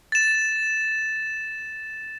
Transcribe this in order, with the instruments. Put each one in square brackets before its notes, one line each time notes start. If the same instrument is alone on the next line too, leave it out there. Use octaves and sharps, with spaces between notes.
[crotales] A6 E7